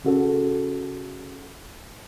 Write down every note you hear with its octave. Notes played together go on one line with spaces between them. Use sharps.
C#3 F#4 A4